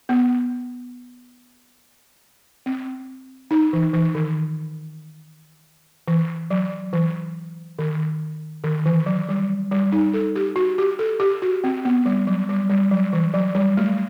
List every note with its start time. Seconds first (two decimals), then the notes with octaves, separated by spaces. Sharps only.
0.09 B3
2.66 C4
3.51 D#4
3.73 E3
3.94 E3
4.15 D#3
6.08 E3
6.51 F#3
6.93 E3
7.79 D#3
8.64 D#3
8.86 E3
9.06 F#3
9.29 G3
9.71 G3
9.92 D#4
10.14 A4
10.36 G4
10.56 F#4
10.78 G4
10.99 A4
11.20 G4
11.42 F#4
11.64 C4
11.85 B3
12.06 G3
12.27 F#3
12.49 G3
12.70 G3
12.91 F#3
13.13 E3
13.34 F#3
13.55 G3
13.77 A3